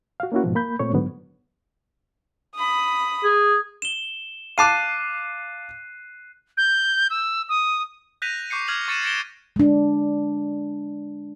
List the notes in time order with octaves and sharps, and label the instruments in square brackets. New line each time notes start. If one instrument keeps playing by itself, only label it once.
[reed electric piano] F#4 F5
A#3 C#4 E4 F#4
G#2 B2 F3
A#3 B5 G6
A#2 A3 C4 C#5 C#6
G#2 D3 F#3 B3
[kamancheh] B5 D#6
[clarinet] G#4
[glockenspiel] E7 G7
[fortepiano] F5 A5 D6 [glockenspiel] F#6 C7 D#7
[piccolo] G6
E6
D#6
[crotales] F#6 G6 A#6 B6 D#7 F7
C#6 D6 G6 C7 C#7
D6 F6 G#6 F7 F#7
C#6 A6 C#7 D#7 E7
A6 A#6 C#7 D7 E7 G7
[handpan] G#3 D4